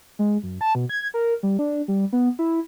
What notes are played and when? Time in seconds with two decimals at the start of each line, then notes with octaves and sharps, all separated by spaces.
0.19 G#3
0.43 F#2
0.61 A5
0.75 B2
0.89 G#6
1.14 A#4
1.43 G3
1.59 D4
1.88 G3
2.13 B3
2.39 E4